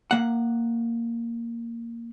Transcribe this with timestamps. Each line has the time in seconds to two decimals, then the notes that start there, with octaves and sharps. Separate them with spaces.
0.11 A#3 F#5